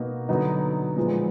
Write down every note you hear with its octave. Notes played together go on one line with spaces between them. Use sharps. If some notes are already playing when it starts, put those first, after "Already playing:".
Already playing: B2 A#3 D#4 F#4
D3 F#3 B3 D#4
A#2 F3 G#3 B3